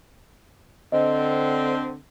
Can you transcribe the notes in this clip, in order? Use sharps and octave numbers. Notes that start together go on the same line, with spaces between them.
D3 C4 D#5